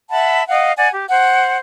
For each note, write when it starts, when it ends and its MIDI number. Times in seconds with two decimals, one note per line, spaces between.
0.10 0.42 76
0.10 0.42 78
0.10 0.42 81
0.10 0.42 83
0.48 0.71 75
0.48 0.71 77
0.48 0.71 78
0.76 0.87 74
0.76 0.87 78
0.76 0.87 80
0.91 1.04 67
1.09 1.57 72
1.09 1.57 78